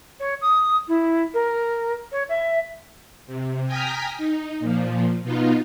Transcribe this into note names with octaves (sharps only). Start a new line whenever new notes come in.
C#5
D#6
E4
A#4
C#5
E5
C3
G5 G#5 A#5 D#6 F6 B6
D#4
A#2 F3
B2 B3 D#4 F4